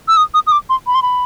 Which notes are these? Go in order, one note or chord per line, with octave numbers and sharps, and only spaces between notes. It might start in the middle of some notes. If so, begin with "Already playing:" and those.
E6
D#6
D#6
D#6
D6
C6
B5
C6
B5